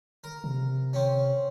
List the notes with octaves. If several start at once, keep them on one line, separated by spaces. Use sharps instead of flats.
A#4
C3
C4 C#4